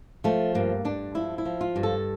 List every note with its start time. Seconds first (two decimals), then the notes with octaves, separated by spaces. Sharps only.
0.24 F3 A3
0.55 G2 A#3
0.85 G2 D4
1.15 F3 E4
1.38 E4
1.45 F3
1.61 F4
1.76 G2
1.83 A4